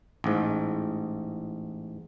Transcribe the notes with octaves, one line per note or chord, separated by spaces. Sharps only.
A1 G#2